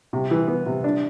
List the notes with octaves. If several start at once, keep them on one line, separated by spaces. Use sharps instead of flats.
C3
E3
B3
C3
D4